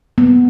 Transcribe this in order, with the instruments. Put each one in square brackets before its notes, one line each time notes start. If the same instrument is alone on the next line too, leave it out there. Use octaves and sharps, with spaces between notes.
[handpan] B3